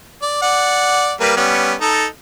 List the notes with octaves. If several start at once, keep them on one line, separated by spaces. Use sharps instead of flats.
D5
D5 F#5
G3 A#3 B4
G3 B3 C#4
D#4 A4